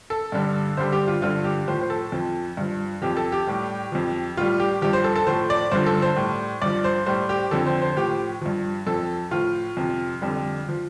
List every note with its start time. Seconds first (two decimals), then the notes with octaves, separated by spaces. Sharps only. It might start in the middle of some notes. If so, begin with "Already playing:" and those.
0.10 A4
0.32 G2 D3 G3
0.77 G2 D3 G3 C5
0.92 G4
1.08 F4
1.22 G2 D3 F3 F4
1.44 G4
1.67 A2 F3 C5
1.81 C5
1.90 A4
2.12 F2 F3
2.57 G2 F3
3.02 F2 F3 G4
3.17 A4
3.32 G4
3.47 A2 G3
3.92 F2 F3
4.37 A2 G3 F4
4.60 G4
4.82 G2 F3 G4
4.93 C5
5.04 A4
5.16 A4
5.27 A2 F3 C5
5.50 D5
5.71 G2 D3 F3 C5
5.86 A4
6.02 C5
6.17 A2 G3
6.62 G2 F3 D5
6.84 C5
7.06 A2 G3 C5
7.29 G4
7.51 F2 D3 F3 A4
7.67 C5
7.82 C5
7.97 A2 F3 G4
8.41 G2 F3
8.87 F2 F3 A4
9.31 A2 F3 F4
9.77 F2 C3 F3
10.22 F2 D3 G3
10.69 F3